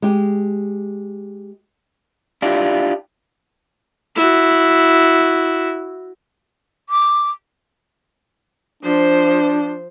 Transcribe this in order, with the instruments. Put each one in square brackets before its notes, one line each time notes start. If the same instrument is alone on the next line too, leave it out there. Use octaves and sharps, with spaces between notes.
[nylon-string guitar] G#3 G4
[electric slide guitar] D4 E4 F4 G4
[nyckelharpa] E4 F#4
[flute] D6
[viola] F3 C5 [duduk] D4